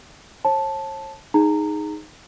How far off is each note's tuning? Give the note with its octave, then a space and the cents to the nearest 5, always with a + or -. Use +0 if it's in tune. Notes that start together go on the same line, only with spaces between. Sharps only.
C#5 -45 A5 -5
D#4 +0 G#4 +0 A#5 -20